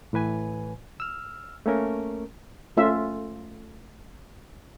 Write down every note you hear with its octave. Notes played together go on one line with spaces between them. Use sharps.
A2 E3 B4 G#5
E6 F6
A3 A#3 C#4 A#4
A3 C#4 F4 E5